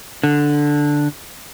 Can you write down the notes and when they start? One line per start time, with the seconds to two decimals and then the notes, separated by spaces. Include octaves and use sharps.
0.23 D3